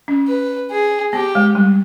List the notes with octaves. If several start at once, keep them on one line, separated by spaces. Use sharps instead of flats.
C#4
B4
G#4
B3 G4
G#3
G3